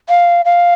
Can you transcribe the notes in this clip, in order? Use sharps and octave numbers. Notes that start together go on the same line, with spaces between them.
F5
F5